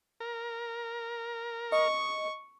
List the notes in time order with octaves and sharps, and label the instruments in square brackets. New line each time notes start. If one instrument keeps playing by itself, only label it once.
[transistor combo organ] A#4
[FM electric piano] D#5 [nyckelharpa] C#6